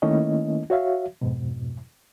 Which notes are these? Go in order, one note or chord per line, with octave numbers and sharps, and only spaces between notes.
D#3 A3 A#3 C#4 E4 D#5
F#4 C#5 E5 F5
F2 G#2 B2